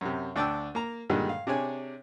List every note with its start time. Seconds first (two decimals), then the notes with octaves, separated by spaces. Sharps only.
0.01 F#2 C3
0.36 D2 D4 D5 G5 A5 E6
0.75 A#3 A#5
1.10 G2 A#2 D3 D#3 G3 G#3
1.29 F5
1.47 C3 D4 G#4 C#5 G#5